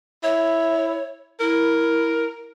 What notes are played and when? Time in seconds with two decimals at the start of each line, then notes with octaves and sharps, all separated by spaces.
0.23 E4 C#5
1.40 E4 A#4